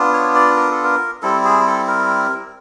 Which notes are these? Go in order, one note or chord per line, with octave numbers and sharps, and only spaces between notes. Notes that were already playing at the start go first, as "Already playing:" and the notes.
Already playing: B3 D4 F4
C#5
D5
A#4
A4
A#4
G3 C4 E4 A4
G#4
A4
A#4